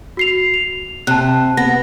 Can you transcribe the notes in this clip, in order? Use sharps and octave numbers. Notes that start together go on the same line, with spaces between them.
F#4 C7 F7
F7
C3 A5 F#6
B3 A#6